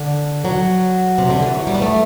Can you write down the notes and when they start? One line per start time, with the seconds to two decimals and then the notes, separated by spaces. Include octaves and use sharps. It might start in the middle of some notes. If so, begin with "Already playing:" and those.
Already playing: D3
0.45 F#3
1.18 C3
1.30 D3
1.43 E3
1.55 F#3
1.67 G3
1.74 B3
1.82 A3